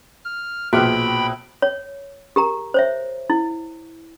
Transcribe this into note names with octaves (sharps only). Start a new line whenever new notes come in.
F6
A#1 B2 F#4 G#4 G5 B5 F6 F#6
C#5
G4 A#4 A#5
C5 C#5 E5
E4